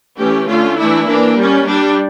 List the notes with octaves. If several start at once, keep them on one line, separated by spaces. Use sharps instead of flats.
E3 A3 C#4 G4
D3 A3 C#4 F4
E3 A3 D4 E4
E3 A#3 D4
G3 C#4
G3 D4